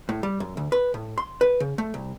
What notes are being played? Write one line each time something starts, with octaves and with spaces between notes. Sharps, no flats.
A2
G3
F#2
D2
B4
A2
C6
B4
C#3
A3
C2